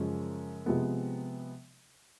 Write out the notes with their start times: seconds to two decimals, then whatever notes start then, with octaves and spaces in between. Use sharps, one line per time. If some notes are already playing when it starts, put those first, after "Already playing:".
Already playing: F#2 C#3 F3 G#3 C#4
0.66 C3 F3 G#3 B3